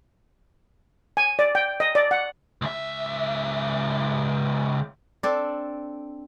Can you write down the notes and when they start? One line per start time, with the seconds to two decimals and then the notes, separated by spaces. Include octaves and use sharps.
1.17 G#5
1.39 D5
1.55 G5
1.80 D#5
1.95 D5
2.11 F#5
2.62 C#2 E5
5.23 C4 D4 A4 D5